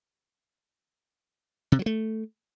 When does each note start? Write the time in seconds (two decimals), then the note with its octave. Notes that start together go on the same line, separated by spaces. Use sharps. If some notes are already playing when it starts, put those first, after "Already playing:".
1.72 C3
1.79 F#3
1.86 A3